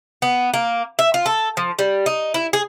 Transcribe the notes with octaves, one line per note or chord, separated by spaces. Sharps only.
B3
A#3
E5
F4
A4
F3
G3
D#4
E4
G#4